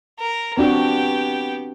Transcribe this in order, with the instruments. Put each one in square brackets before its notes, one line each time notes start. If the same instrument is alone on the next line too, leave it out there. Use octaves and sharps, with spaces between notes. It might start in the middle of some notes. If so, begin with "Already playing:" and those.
[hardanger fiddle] A#4
[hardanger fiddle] B3 G4 [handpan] C4 D4 F#4